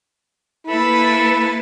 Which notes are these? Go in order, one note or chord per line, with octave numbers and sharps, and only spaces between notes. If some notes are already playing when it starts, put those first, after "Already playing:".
A#3 E4 A4 B4 B5